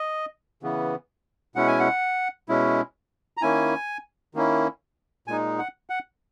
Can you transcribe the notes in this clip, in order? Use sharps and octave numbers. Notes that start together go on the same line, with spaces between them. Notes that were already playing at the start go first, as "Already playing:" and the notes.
Already playing: D#5
C#3 E3 B3
B2 G#3 C#4 E4 F#5
G#5
F#5
B2 G#3 C#4 E4
A#5
D#3 A#3 C#4 E4 G#5
D#3 A#3 C#4 E4
A#2 G#3 D#4 G#5
F#5
F#5